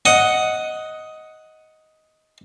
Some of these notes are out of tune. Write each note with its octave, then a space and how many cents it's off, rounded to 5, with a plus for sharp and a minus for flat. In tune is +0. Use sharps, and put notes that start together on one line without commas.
D#5 +10 F#5 +0